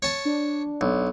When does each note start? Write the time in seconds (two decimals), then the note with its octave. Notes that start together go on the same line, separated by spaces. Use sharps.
0.02 C#5 A5
0.25 D4
0.81 B1